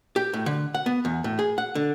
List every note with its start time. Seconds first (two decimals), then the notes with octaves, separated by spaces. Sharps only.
0.16 G4
0.33 A2
0.46 D3
0.75 F#5
0.86 B3
1.05 E2
1.24 A2
1.39 G#4
1.58 F#5
1.75 D3